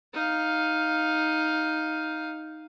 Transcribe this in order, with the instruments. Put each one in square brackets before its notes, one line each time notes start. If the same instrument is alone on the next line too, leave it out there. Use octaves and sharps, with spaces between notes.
[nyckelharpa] D#4 F5